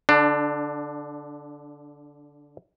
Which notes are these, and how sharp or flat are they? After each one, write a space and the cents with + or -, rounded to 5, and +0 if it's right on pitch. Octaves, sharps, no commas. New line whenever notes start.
D3 -15 D4 +15